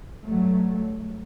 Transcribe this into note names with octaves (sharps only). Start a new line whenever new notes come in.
G2 F#3 A3